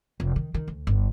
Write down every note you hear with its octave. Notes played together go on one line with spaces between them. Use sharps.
F1
D#3
D#3
D2
G1